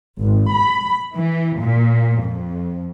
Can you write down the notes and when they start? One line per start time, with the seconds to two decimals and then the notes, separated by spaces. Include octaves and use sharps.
0.21 G#1
0.54 B5
1.15 E3
1.58 A#2
2.20 F2